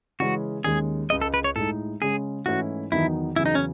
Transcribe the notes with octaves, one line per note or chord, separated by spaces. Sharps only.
C#3 E3 G#3 C#4 F#4
D#2 D#3 G#3 C#4 G#4
C#2 C#3 G#3 D#5
A4
B4
C#5
A2 G#3 D#4 A4
C#3 G#3 C#4 G#4
G#2 E3 A3 C#4 E4 F#4
E2 D#3 F#3 B3 D#4 E4
E2 C#3 F#3 E4
D#4
C#4